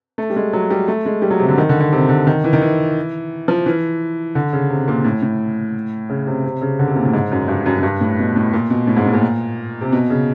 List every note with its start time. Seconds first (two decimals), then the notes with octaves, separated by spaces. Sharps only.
0.18 A3
0.30 G3
0.36 G#3
0.53 F#3
0.71 G3
0.88 A3
1.06 G#3
1.22 G3
1.31 F#3
1.39 C3
1.48 D3
1.58 D#3
1.69 D3
1.80 D3
1.93 C3
2.09 D3
2.27 D#3
2.44 E3
2.53 D#3
2.62 E3
3.48 F3
3.66 E3
4.35 D3
4.53 C#3
4.70 C3
4.88 A#2
5.04 A2
5.22 A2
6.09 C#3
6.27 C3
6.44 C3
6.62 C#3
6.79 D3
6.87 C3
6.96 A#2
7.05 A2
7.14 G#2
7.32 F#2
7.48 G2
7.66 F#2
7.79 F#2
7.83 G2
8.01 A2
8.19 B2
8.36 A2
8.53 A#2
8.70 B2
8.87 A2
8.97 G#2
9.05 A2
9.13 A#2
9.81 C3
9.92 B2
10.10 C#3